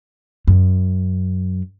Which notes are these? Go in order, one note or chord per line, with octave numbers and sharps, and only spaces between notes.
F#2